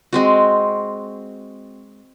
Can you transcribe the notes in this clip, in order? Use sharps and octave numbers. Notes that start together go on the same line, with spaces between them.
G#3 C4 F#4